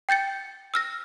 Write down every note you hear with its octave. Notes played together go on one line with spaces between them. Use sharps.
G5 G6 A6 C#7
E6 F6 A#6